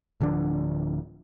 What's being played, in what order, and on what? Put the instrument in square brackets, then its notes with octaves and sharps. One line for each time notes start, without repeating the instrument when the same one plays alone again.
[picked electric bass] D1 D3 F3 D4